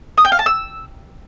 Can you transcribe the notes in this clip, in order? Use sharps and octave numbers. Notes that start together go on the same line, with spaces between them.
D#6
G5
F5
A5
E6